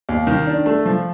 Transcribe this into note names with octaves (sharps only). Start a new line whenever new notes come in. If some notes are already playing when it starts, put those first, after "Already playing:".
D#2
D#3
D4
A3
F3